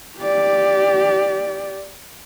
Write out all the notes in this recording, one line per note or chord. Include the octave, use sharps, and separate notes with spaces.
G4 D5